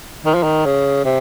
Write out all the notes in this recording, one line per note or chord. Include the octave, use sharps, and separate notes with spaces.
D#3
F3
D#3
C#3
C3